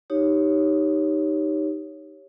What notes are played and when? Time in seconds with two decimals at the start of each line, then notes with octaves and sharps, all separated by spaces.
0.10 D#4 G4 C#5